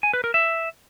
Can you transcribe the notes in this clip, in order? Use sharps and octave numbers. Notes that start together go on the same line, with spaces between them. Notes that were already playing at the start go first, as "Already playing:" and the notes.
G#5
B4
A#4
E5